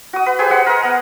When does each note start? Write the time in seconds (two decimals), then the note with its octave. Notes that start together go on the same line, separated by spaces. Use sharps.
0.13 F#4 D#6
0.26 B4
0.39 G4 G#4 B4 C5
0.50 G#3 F#5
0.66 A#4 D#5
0.83 B3